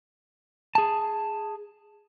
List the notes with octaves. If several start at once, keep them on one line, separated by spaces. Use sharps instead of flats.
G#4 A5